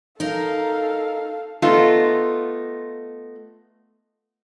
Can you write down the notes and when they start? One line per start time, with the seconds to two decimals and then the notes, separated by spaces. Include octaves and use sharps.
0.20 D#4 A4 A#4 F5
1.62 A3 B3 D#4 F4